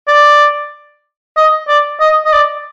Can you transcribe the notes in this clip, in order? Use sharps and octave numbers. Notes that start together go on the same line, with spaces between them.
D5
D#5
D5
D#5
D#5
D5